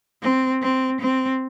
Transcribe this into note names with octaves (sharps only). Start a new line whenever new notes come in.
C4
C4
C4